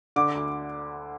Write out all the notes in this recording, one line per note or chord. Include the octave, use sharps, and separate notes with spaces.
D3 D6
D2